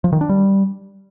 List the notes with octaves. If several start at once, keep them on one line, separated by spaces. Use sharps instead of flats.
F3
D#3
D4
G3